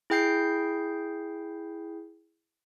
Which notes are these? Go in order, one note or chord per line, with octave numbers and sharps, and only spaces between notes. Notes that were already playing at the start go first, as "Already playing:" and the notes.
E4 G#4 G5 G6 C7